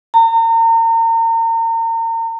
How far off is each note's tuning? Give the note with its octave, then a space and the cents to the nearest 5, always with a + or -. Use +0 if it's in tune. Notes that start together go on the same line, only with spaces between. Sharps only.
A#5 -40